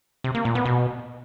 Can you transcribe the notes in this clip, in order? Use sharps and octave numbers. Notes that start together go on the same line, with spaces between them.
C3
A#3
A#2
B3
B2